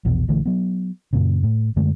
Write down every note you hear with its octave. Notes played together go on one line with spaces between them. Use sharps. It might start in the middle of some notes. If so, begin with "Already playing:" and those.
A#1 E2 B2
A#1 D3 E3 A3
F#3 B3
F#2 A#2 C#3
A2
F#2 D3 G#3 A3